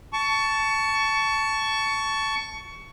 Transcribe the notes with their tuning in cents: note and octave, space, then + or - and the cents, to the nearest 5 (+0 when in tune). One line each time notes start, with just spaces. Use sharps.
A5 +0 C#6 +20